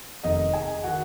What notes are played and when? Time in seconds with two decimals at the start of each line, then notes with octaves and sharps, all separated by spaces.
0.23 F1 F2 D#3 D#4 D#5
0.53 G#4 G#5
0.84 D#3 F#4 F#5